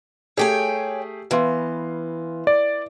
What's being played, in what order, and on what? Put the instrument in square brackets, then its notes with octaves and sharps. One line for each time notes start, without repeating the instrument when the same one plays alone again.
[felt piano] A3 G4 G#4 [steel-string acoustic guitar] C#5 G5 G#5
[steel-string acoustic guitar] E3 [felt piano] B3 F5 C6
[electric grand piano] D5